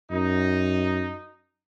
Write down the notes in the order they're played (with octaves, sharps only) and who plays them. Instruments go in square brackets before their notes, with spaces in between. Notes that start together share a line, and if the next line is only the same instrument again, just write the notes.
[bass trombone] F#2 [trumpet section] D#4